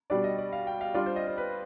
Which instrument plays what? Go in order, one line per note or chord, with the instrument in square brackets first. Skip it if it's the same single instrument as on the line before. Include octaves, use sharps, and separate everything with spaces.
[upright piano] B2 G3 D4 [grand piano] D5
[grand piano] D#5
D5
F5
G5
F5
[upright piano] G3 D4 F4 [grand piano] D5
[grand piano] C5
D#5
C5
B4